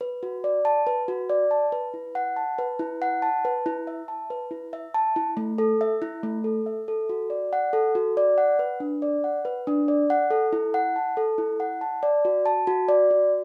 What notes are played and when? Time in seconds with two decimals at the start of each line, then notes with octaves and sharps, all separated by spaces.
0.01 B4
0.23 F#4
0.44 D5
0.65 A5
0.87 B4
1.08 F#4
1.30 D5
1.51 A5
1.72 B4
1.94 E4
2.15 F#5
2.36 A5
2.58 B4
2.79 E4
3.02 F#5
3.22 A5
3.45 B4
3.66 E4
3.87 E5
4.08 A5
4.30 B4
4.51 E4
4.73 E5
4.94 A5
5.16 E4
5.37 A3
5.58 A4
5.81 E5
6.02 E4
6.23 A3
6.44 A4
6.66 E5
6.88 A4
7.09 F#4
7.30 D5
7.53 F#5
7.73 A4
7.95 F#4
8.17 D5
8.38 F#5
8.59 B4
8.80 D4
9.02 D5
9.24 F#5
9.45 B4
9.67 D4
9.88 D5
10.10 F#5
10.31 A4
10.53 E4
10.74 F#5
10.96 A5
11.17 A4
11.38 E4
11.60 F#5
11.81 A5
12.03 D5
12.25 F#4
12.46 A5
12.67 F#4
12.89 D5
13.11 F#4